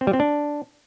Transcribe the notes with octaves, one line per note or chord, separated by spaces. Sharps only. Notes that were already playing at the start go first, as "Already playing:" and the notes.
C4
G3
C4
D4